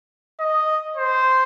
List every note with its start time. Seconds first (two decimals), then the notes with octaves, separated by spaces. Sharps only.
0.40 D#5
0.97 C5